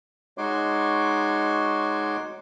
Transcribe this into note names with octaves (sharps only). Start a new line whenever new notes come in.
G#3 D#4 F#4 C#5 C6 D6